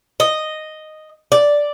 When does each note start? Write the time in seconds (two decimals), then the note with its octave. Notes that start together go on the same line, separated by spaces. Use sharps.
0.20 D#5
1.32 D5